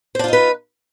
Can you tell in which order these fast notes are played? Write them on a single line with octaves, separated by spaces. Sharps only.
C5 D4 F4 D#4 B4